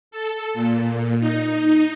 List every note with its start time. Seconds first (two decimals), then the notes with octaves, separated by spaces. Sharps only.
0.11 A4
0.54 A#2
1.20 D#4